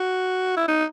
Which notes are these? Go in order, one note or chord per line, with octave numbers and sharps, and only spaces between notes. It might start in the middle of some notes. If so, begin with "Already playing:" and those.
Already playing: F#4
E4
D#4